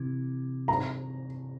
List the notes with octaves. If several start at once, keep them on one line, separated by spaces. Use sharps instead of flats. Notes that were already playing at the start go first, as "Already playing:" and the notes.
Already playing: C3 E3
A#5